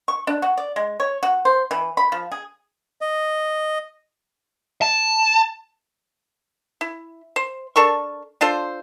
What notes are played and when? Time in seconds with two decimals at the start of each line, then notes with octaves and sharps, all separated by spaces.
0.08 C#6
0.27 D4
0.42 F#4
0.57 D5
0.76 G#3
1.00 C#5
1.23 F#4
1.45 C5
1.71 E3
1.97 B5
2.12 F3
2.32 G#4
3.01 D#5
4.82 A5
6.81 E4
7.36 C5
7.76 D4 A4 A#4 C#6
8.41 D4 F4 A4 C5